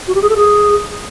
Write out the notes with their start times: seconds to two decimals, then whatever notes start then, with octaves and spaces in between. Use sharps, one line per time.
0.08 F#4
0.15 G4
0.22 G#4
0.29 A4
0.37 G#4